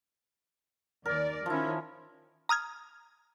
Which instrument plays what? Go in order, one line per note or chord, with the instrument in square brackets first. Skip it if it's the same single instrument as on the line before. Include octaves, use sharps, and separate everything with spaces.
[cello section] D#2 D5 [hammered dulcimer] A#4
[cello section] D#3 C#4 [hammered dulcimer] F3 E4
[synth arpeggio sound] A#5 D#6 F6 G#6